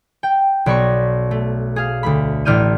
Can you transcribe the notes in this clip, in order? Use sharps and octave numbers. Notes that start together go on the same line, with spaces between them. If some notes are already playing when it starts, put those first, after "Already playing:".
G5
B1 D5 B5 C#6 A#6
A3
G#4 F5
D2 A3 B5
A1 D5 F6 G6 D#7